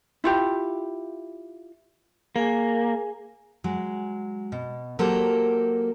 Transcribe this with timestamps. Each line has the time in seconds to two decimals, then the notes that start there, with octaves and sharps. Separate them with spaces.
0.24 E4 F4 G4
2.36 A#3 G#4 G#5
3.64 F#3 G#3
4.52 B2
4.99 F#3 A#3 G4 A4 A#4 C5